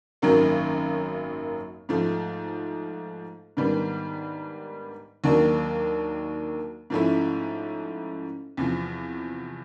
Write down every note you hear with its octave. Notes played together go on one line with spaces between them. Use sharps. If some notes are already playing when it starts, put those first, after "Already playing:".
G#1 F#2 D#3 F#3 A#3
G#2 F3 A3
G#2 D#3 G3 B3 D4
D#2 D#3 F#3 A#3 D4
G#2 F3 A3 C#4 E4
E2 C3 F3